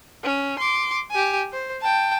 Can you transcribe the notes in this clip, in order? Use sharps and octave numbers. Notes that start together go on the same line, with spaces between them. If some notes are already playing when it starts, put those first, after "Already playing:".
C#4
C6 D6
G4 G#5
C5
G5 A5